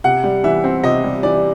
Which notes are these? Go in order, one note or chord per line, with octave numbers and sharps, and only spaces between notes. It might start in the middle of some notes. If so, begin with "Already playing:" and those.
C3 F#5
G3
E3 E5
C4
C3 D#5
G3
E3 D5